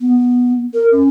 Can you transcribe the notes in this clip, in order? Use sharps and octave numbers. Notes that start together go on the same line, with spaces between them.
B3
A#4
C#4